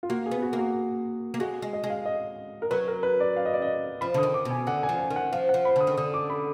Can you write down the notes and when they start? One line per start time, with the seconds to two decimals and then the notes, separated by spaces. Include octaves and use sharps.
0.03 F4
0.09 A#3 F#4
0.26 G#4
0.31 B3
0.42 F#4
0.53 A#3
0.59 F#4
1.34 A#3
1.40 G#3 F#4
1.62 G#3
1.73 D#5
1.84 G#3
1.90 F5
2.06 D#5
2.62 A#4
2.71 F#3 B4
2.88 A#4
3.03 B4
3.20 D5
3.36 F5
3.45 D#5
3.54 D5
3.62 D#5
4.01 F3 B5
4.14 D3 D#6
4.23 D#3
4.34 D6
4.45 B2
4.51 G#5
4.67 D3 F#5
4.83 G#5
4.89 F3
4.99 G#5
5.10 D#3
5.16 F#5
5.32 F3 F5
5.49 F#5
5.54 F3
5.65 B5
5.76 D3 D#6
5.87 D#3
5.98 D3 D#6
6.14 D6
6.30 B5